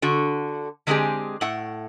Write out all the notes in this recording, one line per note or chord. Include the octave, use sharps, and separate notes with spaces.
D3 F#4
D3 G#3 A3 C4 G4 G#4
A2 F#5